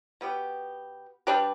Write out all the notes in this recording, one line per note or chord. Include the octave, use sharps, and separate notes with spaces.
B2 B3 G4
G3 D4 G4 B4